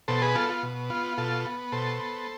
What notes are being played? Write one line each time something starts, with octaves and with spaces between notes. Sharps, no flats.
B2 A4 C5
G#4 B4
B3 F4 A4
F4
B2
B3 F4
B2 F4 A4
B3
B2 A4 C5
B3